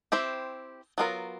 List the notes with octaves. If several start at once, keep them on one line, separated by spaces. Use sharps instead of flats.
C4 E4 G4 C5
F#3 B3 D4 F4 A#4